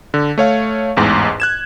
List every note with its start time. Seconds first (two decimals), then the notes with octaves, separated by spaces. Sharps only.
0.14 D3
0.38 A3 C#5 F5
0.97 A1 E2 G#2
1.40 F#6 G#6 E7